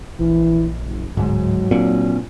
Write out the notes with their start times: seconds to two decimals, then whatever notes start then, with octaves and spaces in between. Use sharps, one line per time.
0.20 A#1 E3
0.83 F#1
1.17 D1 G#2 F#3 G#3
1.71 A#2 C4 D4